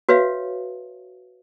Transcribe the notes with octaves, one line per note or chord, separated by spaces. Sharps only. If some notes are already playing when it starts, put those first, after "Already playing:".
F#4 B4 C#5 E5 F5